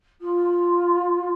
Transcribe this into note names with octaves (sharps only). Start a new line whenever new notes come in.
F4